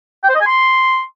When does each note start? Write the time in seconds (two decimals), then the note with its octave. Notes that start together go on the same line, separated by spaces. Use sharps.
0.23 G5
0.29 C5
0.35 D#5
0.41 G#5
0.47 C6